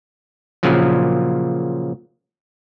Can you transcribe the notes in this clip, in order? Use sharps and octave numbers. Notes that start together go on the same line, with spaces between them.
A#2 C#3 F3 F#3